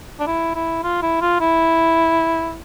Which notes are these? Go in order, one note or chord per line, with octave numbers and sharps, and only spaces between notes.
D4
E4
E4
F4
E4
F4
E4